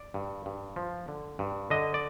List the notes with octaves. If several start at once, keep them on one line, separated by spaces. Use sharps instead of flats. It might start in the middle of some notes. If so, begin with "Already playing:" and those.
Already playing: D5
G2
G2
F3
D3
G2
D3 D#5
D5